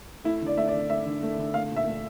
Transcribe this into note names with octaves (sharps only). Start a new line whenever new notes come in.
A3 E4
D3 D5
A3 E5
D5
D3
A3 E5
D3
A3
D3
A3 F5
A#2
E5
A3